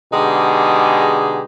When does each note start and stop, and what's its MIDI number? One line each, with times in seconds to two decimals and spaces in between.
0.13 1.42 47
0.13 1.42 50
0.13 1.42 56
0.13 1.42 63
0.13 1.42 67
0.13 1.42 68